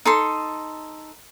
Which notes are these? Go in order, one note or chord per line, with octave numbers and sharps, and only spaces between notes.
D#4 A4 C6